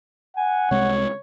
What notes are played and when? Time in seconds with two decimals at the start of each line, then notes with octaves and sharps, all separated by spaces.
0.37 F#5 G#5
0.71 C2 C3 G#3 C#5